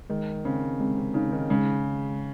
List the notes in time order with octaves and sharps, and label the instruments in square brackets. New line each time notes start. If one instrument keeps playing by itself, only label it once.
[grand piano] D#3 [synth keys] G#3
[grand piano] C#3 [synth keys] C4
[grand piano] C3 [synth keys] G#3
[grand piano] C3
[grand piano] C#3 [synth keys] D#4
[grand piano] D#3
[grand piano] C#3 [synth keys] G#3